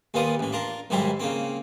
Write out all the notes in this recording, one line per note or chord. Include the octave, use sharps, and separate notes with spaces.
D#2 A#2 B3 F4 D5 D#6
A1 E3
D4 F4 A#4
B1 G#2 D#3 G3 E4 C5
C#3 A#3 C4